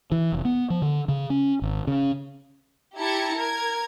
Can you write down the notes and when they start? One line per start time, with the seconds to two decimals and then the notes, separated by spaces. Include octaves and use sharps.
0.12 E3
0.32 F1
0.45 B3
0.70 F3
0.82 D3
1.08 C#3
1.30 C#4
1.62 G#1
1.87 C#3
2.97 E4 G4 A5 A#5 G#6 C#7
3.37 A#4 G#6